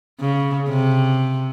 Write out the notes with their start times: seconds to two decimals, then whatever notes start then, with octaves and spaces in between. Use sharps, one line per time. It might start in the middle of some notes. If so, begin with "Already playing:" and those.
0.20 C#3
0.69 C3